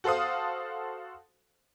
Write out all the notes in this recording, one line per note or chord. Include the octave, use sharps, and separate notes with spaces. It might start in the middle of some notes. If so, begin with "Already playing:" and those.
F#4 A4 C5 F5 D#6